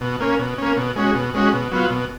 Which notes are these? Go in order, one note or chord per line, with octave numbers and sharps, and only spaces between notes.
B2
A#3 C#4
B2
A#3 C#4
B2
G#3 C#4 F#4
B2
G#3 C#4 F#4
B2
F#3 B3 F4
B2